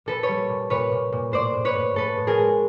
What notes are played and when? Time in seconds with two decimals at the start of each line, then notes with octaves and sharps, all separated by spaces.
0.06 A#2 A4 B4
0.23 B4 C#5
0.29 G3
0.49 A#2
0.70 A#2 B4 C#5
0.92 A#2
1.12 A#2
1.32 A2 C5 D5
1.54 A2
1.65 B4 C#5
1.75 A2
1.94 A2 A4 B4
2.17 A2
2.27 G#4 A#4
2.39 G#3